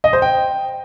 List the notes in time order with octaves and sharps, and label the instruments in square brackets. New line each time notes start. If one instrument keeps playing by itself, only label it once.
[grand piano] D#5
C5
G5